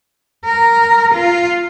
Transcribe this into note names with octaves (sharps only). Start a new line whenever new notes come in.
A#4
F4